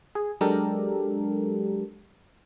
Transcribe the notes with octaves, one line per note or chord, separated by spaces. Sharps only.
G#4
F#3 G#3 D4 G4 A4 A#4